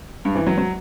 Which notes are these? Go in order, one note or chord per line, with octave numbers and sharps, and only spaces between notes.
G2
E3
F#3
F#3